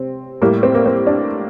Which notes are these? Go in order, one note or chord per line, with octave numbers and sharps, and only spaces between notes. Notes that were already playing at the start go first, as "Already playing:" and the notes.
Already playing: C3 C4
A2 G3 A#3
C4
A#3
C4
D4